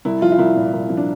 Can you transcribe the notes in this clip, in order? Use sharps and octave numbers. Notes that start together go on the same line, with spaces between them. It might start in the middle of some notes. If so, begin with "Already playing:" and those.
C2 E4
F3 F4
F4
C2 E4
A#2
C2
F3
D4